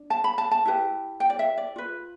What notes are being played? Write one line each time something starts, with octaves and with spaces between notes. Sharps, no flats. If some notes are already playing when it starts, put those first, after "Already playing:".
Already playing: D4
A5
B5
A5
A5
E4 G4 B4
G5
D5
E5
D5
F4 B4